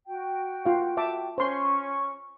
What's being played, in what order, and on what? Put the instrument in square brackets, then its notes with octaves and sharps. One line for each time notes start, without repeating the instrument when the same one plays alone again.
[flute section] F#4 G5
[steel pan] F4 F5
E5 A5 D6
[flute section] C#4 C#6 [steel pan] C5 C6